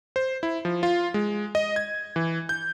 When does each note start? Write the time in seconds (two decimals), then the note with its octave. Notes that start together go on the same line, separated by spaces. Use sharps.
0.16 C5
0.43 E4
0.65 F3
0.83 F4
1.14 G#3
1.55 D#5
1.76 G#6
2.16 E3
2.49 G6